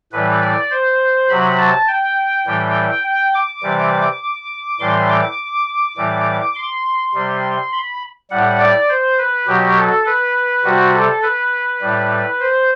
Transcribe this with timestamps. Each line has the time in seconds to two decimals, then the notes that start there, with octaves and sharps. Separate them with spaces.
0.12 A2 E3 G3 B4
0.42 D5
0.70 C5
1.29 C3 F#3 B5
1.58 A5
1.88 G5
2.46 A2 E3 G3
3.04 G5
3.34 D6
3.63 C3 E3 G3
4.80 A2 E3 G3 C6
5.09 D6
5.97 A2 E3 G3
6.55 C6
7.14 C3 G3
7.72 B5
8.31 A2 G3 F#5
8.60 D5
8.89 C5
9.18 B4
9.47 B2 F#3 G4
9.76 A4
10.06 B4
10.64 C3 G3 F#4
10.93 A4
11.23 B4
11.81 A2 G3
12.39 C5